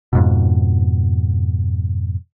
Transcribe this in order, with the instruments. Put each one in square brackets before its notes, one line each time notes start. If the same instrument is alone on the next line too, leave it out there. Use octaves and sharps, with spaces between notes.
[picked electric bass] F2 G#2 B2